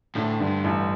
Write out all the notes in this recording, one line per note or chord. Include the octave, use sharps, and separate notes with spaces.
D2 A2
G2 D3
A1